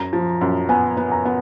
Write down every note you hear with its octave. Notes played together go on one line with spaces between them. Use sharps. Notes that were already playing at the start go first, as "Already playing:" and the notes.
Already playing: F#2 A#5
F3
F#2
B3 G#5
B3
A#5
B3